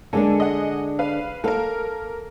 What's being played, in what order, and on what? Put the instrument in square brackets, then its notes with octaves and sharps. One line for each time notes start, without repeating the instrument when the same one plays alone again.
[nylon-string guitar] D3 G#3 D4 [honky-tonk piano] A#3 A4 G#5
[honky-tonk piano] D#5 F#5 G#5
B4 F5
[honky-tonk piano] A#3 A#4 [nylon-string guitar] A4 F5